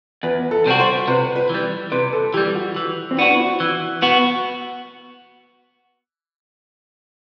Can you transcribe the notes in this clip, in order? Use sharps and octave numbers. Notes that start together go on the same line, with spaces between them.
E2 B4
A4
C3 G3 C4 F#4
C5
C3 B4
B4
E3 G3
C3 B4
A4
E3 G3 G4
F#4
E3
C4
B3 D4 F#4
E4
F#4
E3
B3 F#4